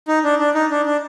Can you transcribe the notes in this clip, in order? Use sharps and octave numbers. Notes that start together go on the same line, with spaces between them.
D#4
D4
D4
D#4
D4
D4